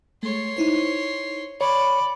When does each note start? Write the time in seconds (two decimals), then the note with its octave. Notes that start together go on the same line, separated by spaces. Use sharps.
0.23 G#3 A3 C#5 C6
0.57 D#4 E4 C5
1.61 C#5 D5 B5 C#7